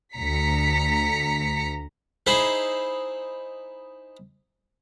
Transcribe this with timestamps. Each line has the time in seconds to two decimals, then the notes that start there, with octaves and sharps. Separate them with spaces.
0.14 D2 A#5 B6 C#7
2.27 D#4 E4 G#4 C5 E5 B5